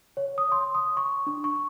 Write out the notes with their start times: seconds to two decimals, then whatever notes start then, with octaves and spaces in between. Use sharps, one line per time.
0.17 C#5
0.38 D#6
0.52 C6
0.75 D#6
0.97 C#6
1.27 D4
1.44 C#6